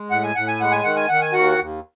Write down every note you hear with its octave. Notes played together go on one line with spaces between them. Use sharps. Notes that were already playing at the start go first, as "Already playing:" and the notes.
Already playing: G#3
A2 F#5
G#5
A2 F#5
G#5
G#3 F#5
G#5
D#3 F#5
G#5
D#3 F#5
G#5
D#2 F#4 F#5
D#2